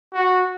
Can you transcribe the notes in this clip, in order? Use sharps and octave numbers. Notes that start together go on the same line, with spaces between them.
F#4